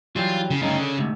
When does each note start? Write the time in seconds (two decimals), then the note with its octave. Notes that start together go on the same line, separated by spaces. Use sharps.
0.16 E3 F#3 G3 F4
0.51 C#3
0.62 D2 G2 C#3 D#4
0.80 D3
0.98 D2 G#2 C3